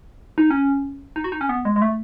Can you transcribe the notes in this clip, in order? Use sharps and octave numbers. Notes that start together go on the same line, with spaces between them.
D#4
C#4
D#4
F#4
D#4
C#4
B3
G#3
G#3
A3